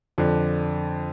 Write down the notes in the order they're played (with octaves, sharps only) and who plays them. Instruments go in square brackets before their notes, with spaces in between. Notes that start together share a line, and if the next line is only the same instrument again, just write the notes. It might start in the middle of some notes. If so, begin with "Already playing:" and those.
[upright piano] F2 D3